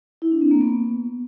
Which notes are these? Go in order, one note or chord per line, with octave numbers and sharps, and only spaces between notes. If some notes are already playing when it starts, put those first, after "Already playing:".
E4
D4
C4
A#3
B3